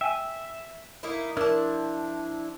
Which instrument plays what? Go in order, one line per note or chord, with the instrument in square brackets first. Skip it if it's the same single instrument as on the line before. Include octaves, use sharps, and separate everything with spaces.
[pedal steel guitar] E5 [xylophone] G5 G#5
[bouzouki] A#3 D#4 E4
[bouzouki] F3 A5 [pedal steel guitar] D4 E4 [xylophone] A#4